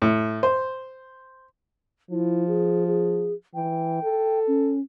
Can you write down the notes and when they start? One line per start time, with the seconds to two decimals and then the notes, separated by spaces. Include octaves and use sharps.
0.02 A2
0.43 C5
2.11 F3 E4
2.47 G#4
2.87 G#4
3.54 E3 G5
4.03 A4
4.47 C#4